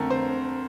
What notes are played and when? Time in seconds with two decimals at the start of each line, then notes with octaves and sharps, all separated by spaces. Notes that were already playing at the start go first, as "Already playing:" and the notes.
Already playing: F2 D3 A3 A#4
0.10 C5